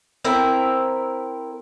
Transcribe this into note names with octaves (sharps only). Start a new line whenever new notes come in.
C4 E4 A#4 E5